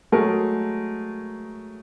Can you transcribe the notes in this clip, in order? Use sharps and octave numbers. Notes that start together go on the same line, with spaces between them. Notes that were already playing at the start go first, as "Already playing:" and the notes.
F#3 G#3 A3 G#4 A#4